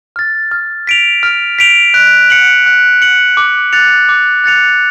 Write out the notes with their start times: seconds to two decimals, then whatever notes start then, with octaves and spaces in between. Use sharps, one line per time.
0.16 F6 A6
0.51 F6
0.87 B6 D7 F7
1.23 F6
1.59 B6 D7 F7
1.94 F#6
2.30 C#7 F#7
2.66 F#6
3.02 C#7 F#7
3.37 D6
3.73 F#6 A6 C#7 F7
4.09 D6
4.44 F#6 A6 C#7 F7